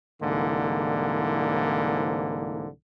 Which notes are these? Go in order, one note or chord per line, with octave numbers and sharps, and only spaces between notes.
C2 G#2 D3 E3 A#3